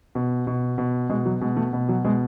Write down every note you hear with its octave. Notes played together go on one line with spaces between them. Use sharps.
B2
B2
B2
B2 G#3
F#3
B2 G#3
A3
B2
F#3
B2 G#3